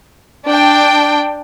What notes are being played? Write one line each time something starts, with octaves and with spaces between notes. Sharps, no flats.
D4 G5